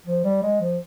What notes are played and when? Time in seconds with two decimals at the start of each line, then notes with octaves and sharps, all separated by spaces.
0.06 F3
0.24 G3
0.42 G#3
0.61 F3